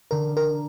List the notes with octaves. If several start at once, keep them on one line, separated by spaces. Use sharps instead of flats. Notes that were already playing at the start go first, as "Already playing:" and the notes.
D3 A#4
A#4